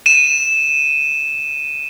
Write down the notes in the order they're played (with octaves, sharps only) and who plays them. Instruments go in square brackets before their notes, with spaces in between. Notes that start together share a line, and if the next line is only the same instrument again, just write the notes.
[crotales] D#7 E7